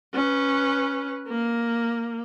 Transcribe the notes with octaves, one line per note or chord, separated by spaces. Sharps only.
C#4 B4
A#3